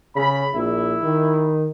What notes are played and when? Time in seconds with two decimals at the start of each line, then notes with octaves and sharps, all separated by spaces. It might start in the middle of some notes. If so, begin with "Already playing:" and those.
0.16 C#3 B5
0.55 A#1 E4
1.03 D#3